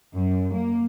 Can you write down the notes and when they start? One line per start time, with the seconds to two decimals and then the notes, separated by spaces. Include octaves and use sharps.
0.15 F#2
0.52 A#3